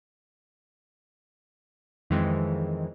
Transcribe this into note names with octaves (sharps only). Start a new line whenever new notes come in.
F2 D#3 E3 G#3 C4